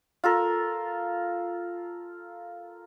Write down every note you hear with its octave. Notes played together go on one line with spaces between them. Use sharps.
F4 A4 A#4